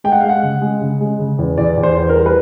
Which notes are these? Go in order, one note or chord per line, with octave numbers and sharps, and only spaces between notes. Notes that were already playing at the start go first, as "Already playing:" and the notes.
G#3 G5
F#5
F5
G#3
F#5
C#3
G#3
C#3
G#3
C#3
E2
E2 D5
E2
C5
E2
A#4
G3
B4